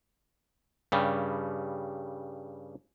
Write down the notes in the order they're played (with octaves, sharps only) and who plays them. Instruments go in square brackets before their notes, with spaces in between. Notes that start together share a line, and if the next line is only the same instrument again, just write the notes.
[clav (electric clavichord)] G2 C#3 G3